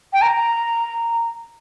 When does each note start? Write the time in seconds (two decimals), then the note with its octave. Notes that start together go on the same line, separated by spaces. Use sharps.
0.13 G5
0.22 A#5